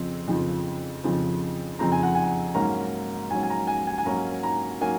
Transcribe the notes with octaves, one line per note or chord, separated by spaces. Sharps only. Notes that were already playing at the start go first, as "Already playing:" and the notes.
Already playing: F2 C#3 F3 C4
F2 C#3 F3 C4
F2 C#3 F3 C4
F2 C#3 F3 C4 A#5
G#5
F#5
G#5
G#2 F#3 A#3 C#4 A#5
G#2 F#3 A#3 C#4 G#5
G#5
A#5
G#5
G#5
G#5
G#2 F#3 A#3 C#4 A#5
A#5
F#3 A#3 C#4 G#5